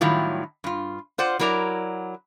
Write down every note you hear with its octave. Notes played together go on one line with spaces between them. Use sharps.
A2 D#3 F#3 G3 E4 F4
G2 F4
F4 C5 D5 F#5
F#3 E4 A#4 D5 A#5